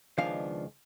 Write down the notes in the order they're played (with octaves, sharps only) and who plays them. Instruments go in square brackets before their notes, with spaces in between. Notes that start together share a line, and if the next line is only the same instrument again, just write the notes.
[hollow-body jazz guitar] C#2 D#3 F3 B3 D4 F5